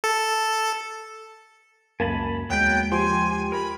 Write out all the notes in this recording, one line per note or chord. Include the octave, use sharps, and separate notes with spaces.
A4
C#2 F#2 A#3 G#5 A5 B5
D#2 F#3 G#3 B3 G5 G6
F3 G4 G#5 C6
A#4 B5